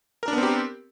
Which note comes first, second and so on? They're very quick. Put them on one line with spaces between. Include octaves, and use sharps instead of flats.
A#4 D4 B3 C4 G4